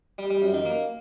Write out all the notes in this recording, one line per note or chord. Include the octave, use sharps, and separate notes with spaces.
G3
G3
F#2
D#3
A#3